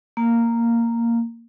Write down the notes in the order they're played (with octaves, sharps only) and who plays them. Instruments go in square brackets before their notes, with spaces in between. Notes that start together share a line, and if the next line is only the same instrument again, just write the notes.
[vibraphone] A#3